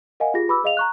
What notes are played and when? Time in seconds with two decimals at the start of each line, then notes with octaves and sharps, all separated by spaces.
0.20 A#4 D#5 F5 F#5 G#5
0.34 F4 G4 G#4 A#6
0.48 G4 B4 B5 D6 E6
0.64 G#4 D#5 F5 F7
0.77 A#5 C#6 F#6